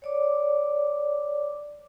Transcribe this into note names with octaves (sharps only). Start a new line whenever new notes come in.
C#5 D5 D6